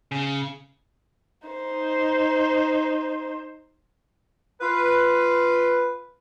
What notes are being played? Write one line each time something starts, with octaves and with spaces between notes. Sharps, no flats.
C#3
D#4 C5
F4 B4